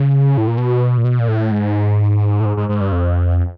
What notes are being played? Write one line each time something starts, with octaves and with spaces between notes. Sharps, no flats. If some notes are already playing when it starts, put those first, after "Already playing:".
Already playing: C#3
A2
A#2
B2
A#2
B2
A#2
A2
G#2
A2
G#2
G#2
G#2
G2
F2